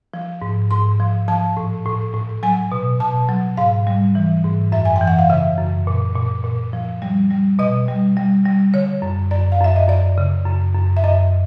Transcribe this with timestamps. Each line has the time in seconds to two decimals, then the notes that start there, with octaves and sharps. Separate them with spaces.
0.14 F3
0.42 G#2
0.71 G#2 C6
1.00 F3
1.28 F3 A5
1.57 A2
1.85 A2
2.14 A2
2.43 F#3 G#5
2.72 B2
3.00 B2 A5
3.29 F#3
3.57 G#2 F5
3.87 G3
4.15 E3
4.44 G#2
4.72 F#2 E5
4.85 G#5
4.96 G5
5.01 E3
5.07 F#5
5.19 F5
5.30 C#3 E5
5.58 F#2
5.87 A#2
6.16 A#2
6.44 A#2
6.73 F3
7.02 G3
7.30 G3
7.59 B2 D#5
7.88 G3
8.17 G3
8.46 G3
8.74 D3 C#5
9.02 F#2
9.31 F#2 D5
9.52 F5
9.60 F#2 E5
9.76 D#5
9.88 F#2 D5
10.18 C#3
10.46 F#2
10.74 F#2
10.97 E5
11.03 F#2 D#5